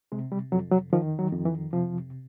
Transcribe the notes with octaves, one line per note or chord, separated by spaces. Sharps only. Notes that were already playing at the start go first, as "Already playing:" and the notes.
C3 G#3
G3
F2 F#3
F#3
D#3 F3
F#3
F2
E3
C3 F3